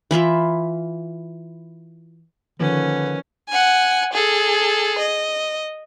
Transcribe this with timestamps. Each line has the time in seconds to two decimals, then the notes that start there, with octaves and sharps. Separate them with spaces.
0.11 E3 E4 F4 E5
2.60 D3 D#3 F3 A#3 C#4 B4
3.49 F#5 G#5
4.13 G#4 A4
4.98 D#5